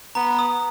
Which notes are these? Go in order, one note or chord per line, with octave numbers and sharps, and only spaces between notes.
B3 A#5
D#6